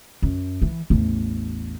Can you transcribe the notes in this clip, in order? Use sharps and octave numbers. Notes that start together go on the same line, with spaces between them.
F#2
E3
A1 E2